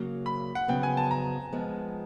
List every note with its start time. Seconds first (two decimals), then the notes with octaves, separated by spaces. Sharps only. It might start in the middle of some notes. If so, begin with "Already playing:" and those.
Already playing: C#3 F#3 A#3
0.26 B5
0.55 F#5
0.68 F2 C#3 F#3 B3 G5
0.83 G#5
0.97 A5
1.11 A#5
1.52 F3 G#3 B3